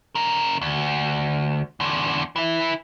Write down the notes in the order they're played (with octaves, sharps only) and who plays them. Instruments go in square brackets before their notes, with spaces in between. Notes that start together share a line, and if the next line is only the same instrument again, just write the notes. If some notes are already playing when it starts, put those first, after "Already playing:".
[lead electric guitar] C#3 A#4
D2
E2 D3
E3 E4